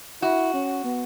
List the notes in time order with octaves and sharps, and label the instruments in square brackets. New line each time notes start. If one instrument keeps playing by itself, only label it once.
[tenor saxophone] E4 [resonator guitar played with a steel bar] F#4
[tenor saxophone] C#4
B3